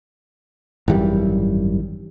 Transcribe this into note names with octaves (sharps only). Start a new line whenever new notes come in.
G#1 F#2 E3 G3